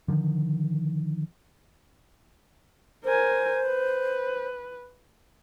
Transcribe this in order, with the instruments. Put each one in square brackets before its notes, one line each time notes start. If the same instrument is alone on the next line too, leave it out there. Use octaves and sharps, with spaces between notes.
[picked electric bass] D3 D#3 F3
[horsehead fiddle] A#4 G#5 [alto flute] C5
[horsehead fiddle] B4